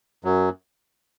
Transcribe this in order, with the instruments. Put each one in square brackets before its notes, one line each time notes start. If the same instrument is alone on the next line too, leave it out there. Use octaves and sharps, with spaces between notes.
[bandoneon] F#2 F#3